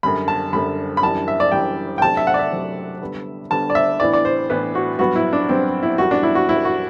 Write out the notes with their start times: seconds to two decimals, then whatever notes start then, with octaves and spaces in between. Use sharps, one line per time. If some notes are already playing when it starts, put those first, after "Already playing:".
0.03 F#2 D3 G3 B5
0.28 A5
0.53 F#2 D3 G3 B5
0.97 B5
1.03 F#2 E3 G3 D4 A5
1.28 E5
1.40 D5
1.52 F#2 E3 G3 D4 G5
1.98 G5
2.02 C3 F#3 A3 D4 A5
2.17 E5
2.27 F#5
2.34 D5
2.39 E5
2.52 C3 F#3 A3 D4
3.01 D3 G3 B3
3.51 D3 G3 B3 A5
3.70 D5
3.75 E5
4.00 A2 E3 B3 D4 D5
4.13 D5
4.25 C5
4.50 A2 E3 B3 D4 B4
4.75 F#4
4.99 G2 F#3 B3 F#4
5.16 E4
5.33 D4
5.49 G2 F#3 B3 C4
5.83 E4
5.98 F#2 E3 G3 F#4
6.11 D4
6.23 E4
6.35 F#4
6.49 F#2 E3 G3 E4
6.65 F#4